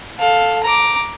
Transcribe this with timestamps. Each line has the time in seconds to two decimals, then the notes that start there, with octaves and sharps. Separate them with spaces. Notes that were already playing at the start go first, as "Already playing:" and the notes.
0.18 A4 F5
0.63 A#5 D6